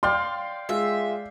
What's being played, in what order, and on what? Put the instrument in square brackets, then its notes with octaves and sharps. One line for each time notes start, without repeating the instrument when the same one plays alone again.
[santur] D5 F5 G5 [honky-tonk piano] C6
[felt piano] G#3 F4 [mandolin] E5